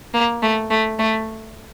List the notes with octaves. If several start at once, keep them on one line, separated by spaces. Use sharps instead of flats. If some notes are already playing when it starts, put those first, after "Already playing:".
A#3
A3
A3
A3